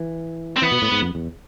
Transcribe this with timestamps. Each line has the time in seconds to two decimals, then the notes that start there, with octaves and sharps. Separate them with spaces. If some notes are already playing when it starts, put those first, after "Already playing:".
Already playing: E3
0.56 C4
0.62 E3 B3
0.71 B2
0.82 A2
0.92 G#2
1.02 F2
1.15 E2